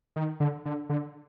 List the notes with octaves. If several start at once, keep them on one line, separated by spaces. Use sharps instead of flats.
D#3
D3
D3
D3